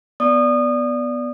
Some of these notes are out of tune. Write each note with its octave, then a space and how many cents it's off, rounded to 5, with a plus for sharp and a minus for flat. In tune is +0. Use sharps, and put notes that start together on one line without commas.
B3 +0 D5 -5 D#6 -25